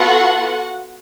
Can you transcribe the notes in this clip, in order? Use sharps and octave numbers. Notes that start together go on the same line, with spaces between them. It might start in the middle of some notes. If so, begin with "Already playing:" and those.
Already playing: B3 F4 F#4 A4 F#5